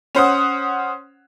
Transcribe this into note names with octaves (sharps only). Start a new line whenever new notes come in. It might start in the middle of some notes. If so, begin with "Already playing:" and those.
C#4 C5 F#5 D#6